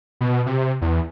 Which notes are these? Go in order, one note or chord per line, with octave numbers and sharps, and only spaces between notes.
B2
C3
E2